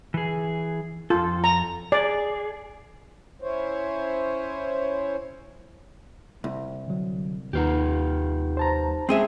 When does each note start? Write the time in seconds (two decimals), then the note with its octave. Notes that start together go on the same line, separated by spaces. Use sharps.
0.14 E3 G#4
1.10 F2 F4 A4
1.44 A#5
1.92 G#4 D5
3.42 C#4 E4 C5 C#5
6.44 C2
6.87 D3 F#3
7.53 D#2 D#4 F4 G4 B4 F#5
8.57 C5 A5 A#5
9.09 G#3 C4 C#4 G#4 E5